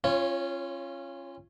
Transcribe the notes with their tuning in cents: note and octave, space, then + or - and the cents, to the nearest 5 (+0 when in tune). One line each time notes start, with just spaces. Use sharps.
C#4 -30 F4 -20 C#5 +0